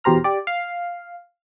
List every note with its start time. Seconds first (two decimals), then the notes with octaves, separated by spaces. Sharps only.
0.04 E2 B2 G4 C5 A#5 F6
0.24 G4 D5
0.47 F5